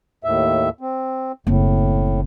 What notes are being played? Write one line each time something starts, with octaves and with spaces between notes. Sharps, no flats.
D#2 A2 E5
C4
F#1 A2 C4